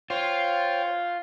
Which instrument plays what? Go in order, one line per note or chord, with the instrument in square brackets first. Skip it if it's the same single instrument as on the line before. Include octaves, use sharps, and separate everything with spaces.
[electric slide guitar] F4 [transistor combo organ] C5 C#5 G5